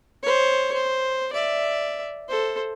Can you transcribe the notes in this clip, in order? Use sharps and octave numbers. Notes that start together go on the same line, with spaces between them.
C5 C#5
C5
D5 E5
A4 C5